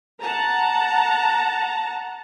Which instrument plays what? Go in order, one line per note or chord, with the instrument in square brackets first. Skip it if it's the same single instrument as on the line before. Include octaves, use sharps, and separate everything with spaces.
[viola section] F#5 A5 A#5